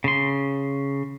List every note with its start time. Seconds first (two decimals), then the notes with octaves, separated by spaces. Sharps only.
0.04 C#3 C6